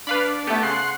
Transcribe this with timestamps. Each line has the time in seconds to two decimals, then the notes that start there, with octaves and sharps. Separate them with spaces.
0.07 D4 B4 F5 B5
0.47 A3 B3 G4 A4
0.63 C#3 F#5 C6